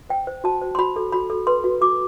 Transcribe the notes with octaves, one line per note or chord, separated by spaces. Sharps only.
C5 G5
C5
F#4 A5
C5
C6
F#4 B5
A4
F#4 B5
A4
B4 C6
F#4
F#4 D6